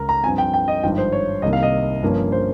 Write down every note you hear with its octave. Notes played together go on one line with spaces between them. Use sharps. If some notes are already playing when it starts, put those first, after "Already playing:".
Already playing: C#2 C#3 A#4
A#5
G2 F3 C4 G#5
G5
G5
D#5
G#1 G2 F3 G5
C5
C#5
C2 C3 D#3 A#3 D#5
F5
D#5
G1 G2 F3 A#3 C#4
C5